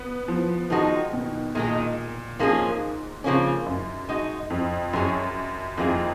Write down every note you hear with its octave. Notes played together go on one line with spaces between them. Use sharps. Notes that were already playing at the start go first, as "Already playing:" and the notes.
Already playing: B3
F3
D#3 F3 G#3 D#4 F#4
B2
A#2 D#3 G#3 D#4
G#2 F3 A#3 C#4 G#4
C#3 F3 A#3 C#4
F#2
G#3 D#4 F#4
F2
F#2 F#3 C#4 G#4
F2 D#3 A#3 F4 G#4